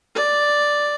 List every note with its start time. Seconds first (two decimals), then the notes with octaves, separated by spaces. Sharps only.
0.15 D5